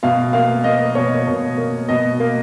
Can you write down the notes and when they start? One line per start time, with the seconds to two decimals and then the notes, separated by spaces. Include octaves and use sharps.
0.03 B2 F5
0.33 A#3 F5
0.64 A#3 D#5
0.95 B2 C#5
1.27 B2
1.58 A#3
1.89 B2 D#5
2.20 A#3